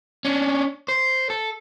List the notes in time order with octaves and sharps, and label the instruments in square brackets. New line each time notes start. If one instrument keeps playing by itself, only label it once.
[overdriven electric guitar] C#4 D4
C5
A4